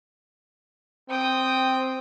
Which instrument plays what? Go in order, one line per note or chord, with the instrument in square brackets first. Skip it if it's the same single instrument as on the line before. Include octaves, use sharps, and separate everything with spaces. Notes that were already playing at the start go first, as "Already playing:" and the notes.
[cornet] C4 [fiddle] G5 D#6